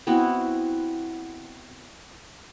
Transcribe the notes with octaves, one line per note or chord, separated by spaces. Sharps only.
B3 C4 E4 F#4